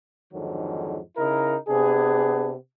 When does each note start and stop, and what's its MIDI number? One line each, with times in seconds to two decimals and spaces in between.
0.33 0.99 41
0.33 0.99 44
0.33 0.99 50
0.33 0.99 51
0.33 0.99 54
1.17 1.56 49
1.17 1.56 63
1.17 1.56 64
1.17 1.56 70
1.68 2.51 48
1.68 2.51 59
1.68 2.51 62
1.68 2.51 68